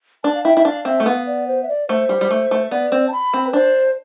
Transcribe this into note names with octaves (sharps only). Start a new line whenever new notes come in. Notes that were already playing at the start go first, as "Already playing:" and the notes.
D4 A5
F5
E4 G5
E4
D4 F5
C4 E5
A3
B3 F5
D5
C5
E5
D5
A3 C5
G3
G3
A3
A3
B3 D5
C4
A5
B5
C4
B4
D4 C5